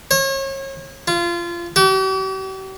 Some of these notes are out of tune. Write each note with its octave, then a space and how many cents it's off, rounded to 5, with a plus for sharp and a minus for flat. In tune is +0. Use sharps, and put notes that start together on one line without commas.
C#5 -35
F4 -25
G4 -45